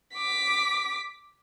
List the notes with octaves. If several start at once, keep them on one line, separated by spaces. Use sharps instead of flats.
D6 B6